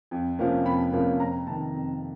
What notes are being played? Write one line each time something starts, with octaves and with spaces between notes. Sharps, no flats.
F2
C3 F3 A#3 C#4
F2 B5
C3 F3 A#3 C#4
F2 A#5
C3 D#3 A5
F2